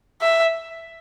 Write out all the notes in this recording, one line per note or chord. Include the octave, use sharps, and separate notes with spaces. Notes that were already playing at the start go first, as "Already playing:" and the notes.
E5